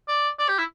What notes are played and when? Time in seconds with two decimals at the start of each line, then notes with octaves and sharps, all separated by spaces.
0.08 D5
0.39 D5
0.48 G4
0.59 E4